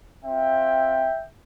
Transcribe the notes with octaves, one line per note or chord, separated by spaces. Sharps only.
C4 F4 E5 G5